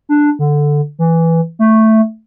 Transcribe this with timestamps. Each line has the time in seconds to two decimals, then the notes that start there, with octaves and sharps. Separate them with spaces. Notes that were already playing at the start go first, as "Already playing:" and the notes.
0.09 D4
0.39 D3
0.99 E3
1.59 A3